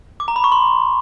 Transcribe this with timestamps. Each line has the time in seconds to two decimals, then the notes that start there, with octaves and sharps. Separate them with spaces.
0.20 D6
0.28 A#5
0.36 B5
0.44 C#6
0.52 C6